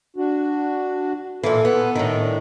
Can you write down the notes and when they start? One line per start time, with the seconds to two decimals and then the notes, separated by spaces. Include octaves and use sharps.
0.17 D4 F#4
1.43 A#2 E3 A4
1.65 B3
1.95 A2 D#3
2.21 D4